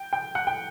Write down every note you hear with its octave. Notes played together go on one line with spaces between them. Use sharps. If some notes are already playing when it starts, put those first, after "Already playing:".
Already playing: G5
G5
F#5
G5